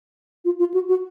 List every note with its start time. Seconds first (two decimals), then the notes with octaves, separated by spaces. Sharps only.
0.45 F4
0.59 F4
0.74 F#4
0.88 F#4